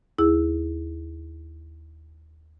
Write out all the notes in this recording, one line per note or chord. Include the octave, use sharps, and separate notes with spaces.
D#2 E4 G#4 E6